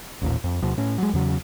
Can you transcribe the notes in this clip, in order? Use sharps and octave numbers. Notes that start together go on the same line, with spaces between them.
A1 D#2 A#2
F2
D2 B2 F3
A2 C#4
F#3 G#3
E2 C#3 F#3